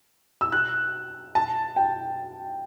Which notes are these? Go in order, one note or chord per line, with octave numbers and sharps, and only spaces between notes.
E6
F#6
A5
G5